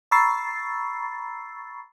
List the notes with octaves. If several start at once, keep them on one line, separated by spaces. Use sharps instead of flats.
A#5 B5 C#6 E6 A6 C7